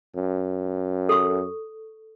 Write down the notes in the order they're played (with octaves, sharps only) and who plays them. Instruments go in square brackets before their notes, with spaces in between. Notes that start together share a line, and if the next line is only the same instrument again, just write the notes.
[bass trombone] F#2
[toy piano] A4 C#6